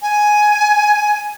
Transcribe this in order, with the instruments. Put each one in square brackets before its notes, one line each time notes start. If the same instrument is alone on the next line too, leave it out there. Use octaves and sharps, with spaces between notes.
[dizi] G#5